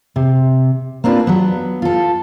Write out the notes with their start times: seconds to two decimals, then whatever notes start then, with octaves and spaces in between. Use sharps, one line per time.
0.16 C3
1.04 A#3 C4 D4 F4 B4
1.27 F#3 B3
1.82 F4 A4